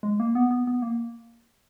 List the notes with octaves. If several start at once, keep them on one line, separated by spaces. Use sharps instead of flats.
G#3
A#3
B3
B3
B3
A#3